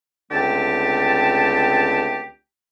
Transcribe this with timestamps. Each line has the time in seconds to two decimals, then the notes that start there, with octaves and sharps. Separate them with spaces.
0.31 C#2 D3 A3 C4 G4 A5